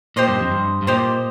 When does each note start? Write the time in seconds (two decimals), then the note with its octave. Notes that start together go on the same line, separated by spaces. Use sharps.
0.16 A#2 G4 C5 D#5
0.28 G2
0.40 F2
0.52 G2
0.82 G2
0.87 A#2 G4 C5 D#5